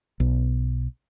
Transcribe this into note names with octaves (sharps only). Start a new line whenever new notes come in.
B1